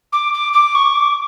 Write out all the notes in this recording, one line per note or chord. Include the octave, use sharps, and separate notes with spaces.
D6
D6
D6
C#6
D6